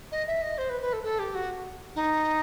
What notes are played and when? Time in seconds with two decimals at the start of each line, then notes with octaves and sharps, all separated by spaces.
0.12 D#5
0.27 E5
0.42 D#5
0.58 C5
0.70 B4
0.81 B4
0.93 A4
1.03 A4
1.19 G4
1.35 F#4
1.96 D#4